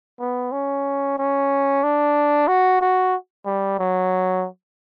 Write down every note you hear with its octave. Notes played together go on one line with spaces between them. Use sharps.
B3
C#4
C#4
D4
F#4
F#4
G3
F#3